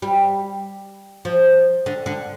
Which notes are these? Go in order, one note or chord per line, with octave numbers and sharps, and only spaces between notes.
G3
F3
D3
D3